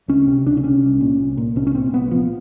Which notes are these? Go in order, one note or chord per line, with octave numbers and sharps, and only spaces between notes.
C#2 C#4
C3
C#2 D4
D4
C3 C#4
C2
A#2
C2
A#2
C2 C#4
C#4
A#2 C4
C2 B3
A#2 F3